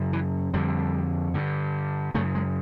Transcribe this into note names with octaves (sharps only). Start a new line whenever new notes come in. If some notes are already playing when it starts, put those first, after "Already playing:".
Already playing: F#2 C#3
E3
F2 D3 G3
G2 D3
F#2 C#3 A3
G#3